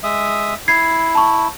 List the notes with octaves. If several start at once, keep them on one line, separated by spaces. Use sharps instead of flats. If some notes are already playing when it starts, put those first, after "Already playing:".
G#3 E5 D#6
E4 G#6 C7
A5 C#6